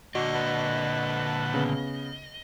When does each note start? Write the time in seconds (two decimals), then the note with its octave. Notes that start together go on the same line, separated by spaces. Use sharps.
0.15 A#2 D3 F#4 D#5
0.35 B4 F#5 A5
1.54 C#3 B3